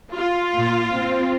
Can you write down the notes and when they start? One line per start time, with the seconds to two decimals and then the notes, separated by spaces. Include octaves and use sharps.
0.14 F4
0.55 A#2
0.95 C4